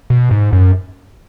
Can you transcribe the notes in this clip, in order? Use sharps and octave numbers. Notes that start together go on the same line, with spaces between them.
B2
G#2
F#2